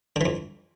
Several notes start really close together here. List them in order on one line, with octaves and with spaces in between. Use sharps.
D3 E3 F2